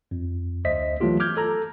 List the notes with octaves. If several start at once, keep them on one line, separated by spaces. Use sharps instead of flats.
F2
D2 C5 D#5 E5 B6
E3 F#3 A3 B3 F4 G4
D6 F6 G6 G#6
A4 A#5